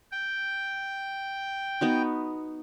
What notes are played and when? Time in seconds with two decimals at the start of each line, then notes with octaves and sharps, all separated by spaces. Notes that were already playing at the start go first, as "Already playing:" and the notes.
0.12 G5
1.81 B3 D#4 F#4